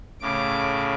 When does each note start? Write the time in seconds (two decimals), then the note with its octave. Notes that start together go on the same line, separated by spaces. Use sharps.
0.22 A2 C#3 D6